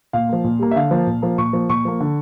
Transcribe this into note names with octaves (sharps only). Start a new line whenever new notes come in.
A#2 F5
F3 A#3
A#2
G3 A#3
E5
D3 F5
F3 A#3
A#2
F3 A#3
A#2 C#6
F3 A#3
A#2 C#6
F3 A#3
D3